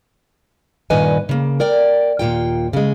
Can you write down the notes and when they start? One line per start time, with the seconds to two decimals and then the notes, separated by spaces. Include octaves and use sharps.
0.90 G2 A#2 D#3 B4 D#5 G#5
1.29 C#3 A#3
1.60 A#4 D5 G5
2.19 D#2 A#2 F4 G5
2.73 C#3 G#3